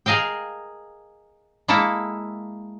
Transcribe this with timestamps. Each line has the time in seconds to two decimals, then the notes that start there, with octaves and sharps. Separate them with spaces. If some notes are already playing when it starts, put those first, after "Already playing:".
0.06 G#4 A#4 D#5 F5 G5
1.68 G#3 A#3 E4 A4